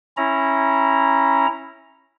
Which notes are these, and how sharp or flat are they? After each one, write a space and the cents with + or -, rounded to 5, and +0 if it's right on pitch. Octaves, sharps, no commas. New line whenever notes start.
C#4 -15 E4 -5 A#5 +0